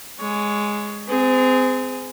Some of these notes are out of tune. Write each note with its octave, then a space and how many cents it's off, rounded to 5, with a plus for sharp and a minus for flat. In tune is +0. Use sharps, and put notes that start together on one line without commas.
G#3 +0 C#5 +15
C4 -30 G#4 +0